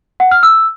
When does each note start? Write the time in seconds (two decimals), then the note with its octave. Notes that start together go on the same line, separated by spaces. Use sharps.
0.20 F#5
0.31 F6
0.43 E6